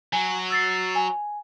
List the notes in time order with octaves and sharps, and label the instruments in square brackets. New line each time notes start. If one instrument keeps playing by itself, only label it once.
[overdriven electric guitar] F#3 [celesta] G#5
[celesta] E6 A6 C7
G#5